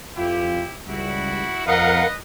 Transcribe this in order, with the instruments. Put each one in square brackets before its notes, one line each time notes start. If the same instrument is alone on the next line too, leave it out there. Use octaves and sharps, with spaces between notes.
[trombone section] F2 F4 [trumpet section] E4 G4
[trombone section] C#2 G3 [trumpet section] E4 F#4
[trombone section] F2 [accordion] A#4 F5 F#5 [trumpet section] B4 D#5